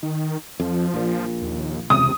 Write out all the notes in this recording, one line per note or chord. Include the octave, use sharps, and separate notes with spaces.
D#3
F2 F3
A#1 A#2
D#2
E1 C#2 C3 D#6